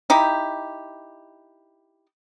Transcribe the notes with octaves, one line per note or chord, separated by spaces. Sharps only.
D#4 E4 G4